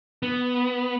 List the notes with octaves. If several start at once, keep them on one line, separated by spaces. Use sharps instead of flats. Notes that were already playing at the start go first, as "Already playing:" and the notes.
B3